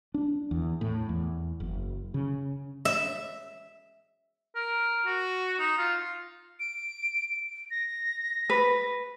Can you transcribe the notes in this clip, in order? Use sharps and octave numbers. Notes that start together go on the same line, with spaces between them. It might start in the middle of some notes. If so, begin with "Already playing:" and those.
D4
E2
A2
E2
F#1
C#3
E5
A#4
F#4
D#4
F4
D7
A#6
B4